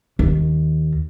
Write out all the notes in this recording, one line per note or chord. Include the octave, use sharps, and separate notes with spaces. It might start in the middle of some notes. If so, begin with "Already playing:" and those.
D#2